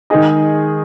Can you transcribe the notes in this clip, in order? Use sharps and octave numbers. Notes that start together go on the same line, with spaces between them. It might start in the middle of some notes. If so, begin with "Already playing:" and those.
D#3 G#3 D#4 G#4 D#5